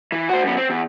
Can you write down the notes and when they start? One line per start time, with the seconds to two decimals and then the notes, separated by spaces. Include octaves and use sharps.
0.12 E3
0.29 F#4 C5
0.44 F#2 B3
0.57 C4
0.70 E2